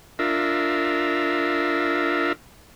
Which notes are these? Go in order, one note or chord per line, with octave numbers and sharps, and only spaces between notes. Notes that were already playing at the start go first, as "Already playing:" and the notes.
D4 F4 A#4 E5